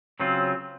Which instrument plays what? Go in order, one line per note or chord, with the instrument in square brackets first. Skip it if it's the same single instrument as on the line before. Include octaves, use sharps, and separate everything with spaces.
[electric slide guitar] C#3 F#3 C4 F4